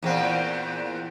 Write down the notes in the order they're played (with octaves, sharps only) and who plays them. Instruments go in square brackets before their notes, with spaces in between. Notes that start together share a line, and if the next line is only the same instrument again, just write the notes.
[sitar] E2 A#2 C4